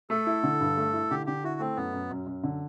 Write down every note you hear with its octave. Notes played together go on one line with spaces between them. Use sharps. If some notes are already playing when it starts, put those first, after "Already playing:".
A3 A4
E4
D3
G2
A3
E4
D3 G4
D3 G4
E4 F#4
A3 C4
F#2 B3
F#2
F#2
F#2
D3